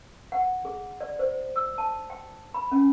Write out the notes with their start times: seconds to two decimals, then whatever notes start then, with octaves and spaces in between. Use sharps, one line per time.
0.32 F#5
0.65 G#4
1.01 D5
1.19 C5
1.56 E6
1.78 A5
2.10 G5
2.54 B5
2.72 C#4